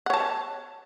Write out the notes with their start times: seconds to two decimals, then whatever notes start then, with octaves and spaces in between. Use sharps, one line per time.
0.06 F#5
0.10 C#5
0.14 A5